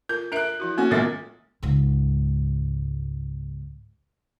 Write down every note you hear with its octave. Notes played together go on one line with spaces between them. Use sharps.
F4 A#4 G6
D4 A#4 E5 F#6 D7
F3 E4 F#4
A#3 C#4 F4 F#4
B1 A#2 G#3 B3 E5 A6
C#2 G#2